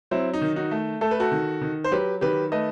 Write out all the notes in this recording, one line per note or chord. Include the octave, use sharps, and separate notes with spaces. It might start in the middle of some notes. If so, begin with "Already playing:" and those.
F#3 C4 E4
D#4
D#3
D#4 F#4
A3
A3 A4
B4
F#4 A4
D#3
D#3
C5
F#3 G4 B4
D#3 G4 B4
A3 B4 D#5